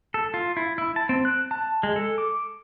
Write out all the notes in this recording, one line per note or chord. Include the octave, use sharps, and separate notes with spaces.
A4
F4
E4
E4
A5
C4
F#6
A5
G#3
A4
D6